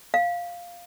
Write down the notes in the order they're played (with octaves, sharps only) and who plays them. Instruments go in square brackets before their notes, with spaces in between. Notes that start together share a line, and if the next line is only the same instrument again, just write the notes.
[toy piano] F5